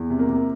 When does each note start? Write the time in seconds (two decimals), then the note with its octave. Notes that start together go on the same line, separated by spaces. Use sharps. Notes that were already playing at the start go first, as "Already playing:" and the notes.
Already playing: E2
0.10 C3
0.19 A#3
0.29 C3